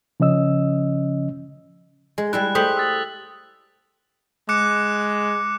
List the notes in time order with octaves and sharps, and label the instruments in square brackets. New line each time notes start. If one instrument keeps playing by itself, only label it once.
[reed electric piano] C#3 F3 C#4 D#5 E6
[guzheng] G#3
[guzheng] G3 G#3 E4 [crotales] F#6
[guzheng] A3 G4 C5 [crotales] D#6 B6 F#7
[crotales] E6 A6
[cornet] G#3 [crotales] D6 F#6 C#7